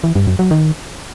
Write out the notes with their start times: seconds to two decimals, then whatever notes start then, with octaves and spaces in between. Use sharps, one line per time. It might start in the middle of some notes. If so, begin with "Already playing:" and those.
0.04 E3
0.15 G2
0.27 F#2
0.39 F#3
0.51 D#3